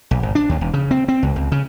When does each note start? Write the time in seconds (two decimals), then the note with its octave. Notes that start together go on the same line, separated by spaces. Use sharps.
0.11 B1
0.23 G#1
0.35 D4
0.49 D#2
0.61 E1
0.74 C#3
0.91 C4
1.08 C4
1.23 C#2
1.36 C#2
1.52 C#3